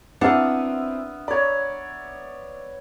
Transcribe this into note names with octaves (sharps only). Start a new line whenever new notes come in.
B3 C4 D4 E4 E5 F#5 D#6 F6
C#5 D5 B5